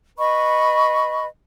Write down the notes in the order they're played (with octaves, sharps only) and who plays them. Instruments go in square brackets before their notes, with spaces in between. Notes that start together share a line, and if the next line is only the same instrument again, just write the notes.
[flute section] B4 D#5 B5 C#6